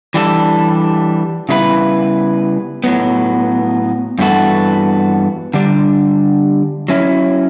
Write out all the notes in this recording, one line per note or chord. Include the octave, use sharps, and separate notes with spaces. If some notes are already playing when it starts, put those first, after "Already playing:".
E3 G3 D4 A4
C#3 G3 B3 E4 B4
A2 F#3 B3
G2 E3 B3 F#4 A4
D3 G3 D4
F#3 C#4 E4